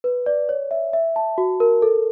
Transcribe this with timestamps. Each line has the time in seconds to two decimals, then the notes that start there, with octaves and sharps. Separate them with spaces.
0.04 B4
0.26 D5
0.49 C#5
0.71 E5
0.93 E5
1.16 A5
1.38 F#4
1.60 A#4
1.82 A4